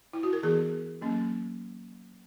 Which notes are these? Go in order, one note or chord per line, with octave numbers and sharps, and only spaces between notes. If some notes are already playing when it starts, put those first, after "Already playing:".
E4
F#4
A#4
E3 B3 G#4
F#3 A#3 C#4